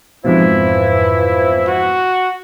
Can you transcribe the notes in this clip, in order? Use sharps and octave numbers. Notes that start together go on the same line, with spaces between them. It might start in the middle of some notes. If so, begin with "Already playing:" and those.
F2 G#2 B2 E3 F3 E4
F#4